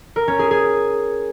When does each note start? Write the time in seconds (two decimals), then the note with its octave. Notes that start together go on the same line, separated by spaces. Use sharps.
0.16 A#4
0.28 C#4
0.39 G#4
0.51 G#4